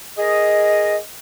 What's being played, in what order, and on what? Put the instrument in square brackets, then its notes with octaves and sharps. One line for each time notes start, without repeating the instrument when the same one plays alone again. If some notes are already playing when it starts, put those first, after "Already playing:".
[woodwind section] G#4 A#4 D#5